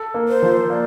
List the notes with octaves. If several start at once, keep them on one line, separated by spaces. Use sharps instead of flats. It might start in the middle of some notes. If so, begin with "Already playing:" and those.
Already playing: A4
A#3
C5
F3
A#3 D5